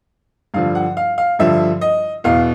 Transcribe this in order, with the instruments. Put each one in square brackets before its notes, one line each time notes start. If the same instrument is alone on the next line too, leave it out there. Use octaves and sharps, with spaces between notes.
[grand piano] G2 D3 F3 F5
F#5
F5
F5
G2 D3 F3 E5
D#5
E2 B2 F5